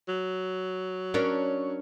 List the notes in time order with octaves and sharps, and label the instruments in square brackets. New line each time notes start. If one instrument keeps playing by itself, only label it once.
[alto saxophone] F#3
[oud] C#4 D4 A#4